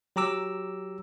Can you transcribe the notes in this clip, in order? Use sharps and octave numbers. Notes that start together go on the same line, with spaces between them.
F#3 G4 A#5 D6 E6